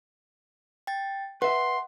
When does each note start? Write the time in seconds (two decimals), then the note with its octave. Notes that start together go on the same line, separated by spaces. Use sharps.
0.87 G5 A6
1.42 B4 E5 F#5 C6